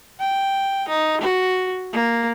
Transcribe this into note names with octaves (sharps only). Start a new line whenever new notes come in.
G5
D#4
F#4
A#3